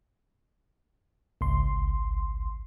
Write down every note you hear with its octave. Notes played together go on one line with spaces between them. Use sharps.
G#1 C#2 C6